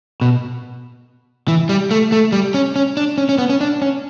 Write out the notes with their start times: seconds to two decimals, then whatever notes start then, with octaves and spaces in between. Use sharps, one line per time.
0.21 B2
1.48 E3
1.69 G3
1.91 A3
2.12 A3
2.32 G3
2.54 C#4
2.76 C#4
2.97 D4
3.18 C#4
3.29 C#4
3.38 B3
3.50 C#4
3.61 D4
3.82 C#4